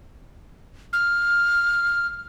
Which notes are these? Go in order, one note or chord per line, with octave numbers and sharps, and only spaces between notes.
F6